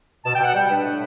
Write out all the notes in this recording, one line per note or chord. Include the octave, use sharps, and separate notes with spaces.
B2 A5
G5
B2 F#5
G3 G5
D4 B4
A2